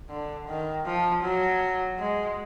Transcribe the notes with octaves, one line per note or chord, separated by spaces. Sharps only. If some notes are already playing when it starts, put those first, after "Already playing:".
D3
D#3
F3
F#3
G#3